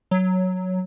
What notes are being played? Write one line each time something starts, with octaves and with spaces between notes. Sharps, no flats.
F#3